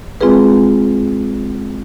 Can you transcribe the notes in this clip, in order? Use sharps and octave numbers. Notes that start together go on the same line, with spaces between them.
G#3 C4 F4 G#4 B4